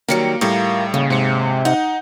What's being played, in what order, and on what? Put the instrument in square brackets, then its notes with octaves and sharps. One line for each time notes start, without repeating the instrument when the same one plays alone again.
[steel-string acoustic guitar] D#3 F#3 G3 [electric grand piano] A#3 C#7
[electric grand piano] A2 G3 [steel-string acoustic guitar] F4 A#4
[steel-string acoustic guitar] D#2 [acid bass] C#3
[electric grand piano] G#2 G#3 C#7 [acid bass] C3
[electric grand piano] D#4 [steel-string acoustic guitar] F#5